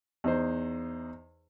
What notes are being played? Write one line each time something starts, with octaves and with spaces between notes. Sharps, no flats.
E2 D#4 C5